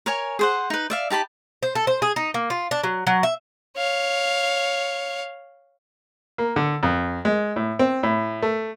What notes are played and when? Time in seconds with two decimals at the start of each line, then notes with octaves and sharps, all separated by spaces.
0.06 A#4 C#5 G#5
0.39 G#4 C5 F#5
0.70 D#4 B4
0.90 D5 E5 F5
1.10 D#4 G4 A5 B5
1.63 C5
1.75 A4
1.87 C5
2.02 G#4
2.16 D#4
2.34 A#3
2.50 F4
2.71 D4
2.83 F#3
3.07 F#3
3.23 E5
3.77 C#5 F5
6.38 A#3
6.56 D3
6.83 F2
7.25 G#3
7.56 A2
7.79 C4
8.03 A2
8.42 A3